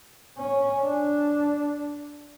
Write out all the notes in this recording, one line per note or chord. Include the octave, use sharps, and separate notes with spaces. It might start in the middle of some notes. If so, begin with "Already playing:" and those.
C#4
D4